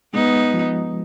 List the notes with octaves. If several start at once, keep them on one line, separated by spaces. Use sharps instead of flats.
G#3 B3 D#4
F3